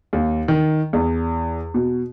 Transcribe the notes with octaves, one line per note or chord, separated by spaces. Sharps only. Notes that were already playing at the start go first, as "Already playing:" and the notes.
D#2
D#3
E2
B2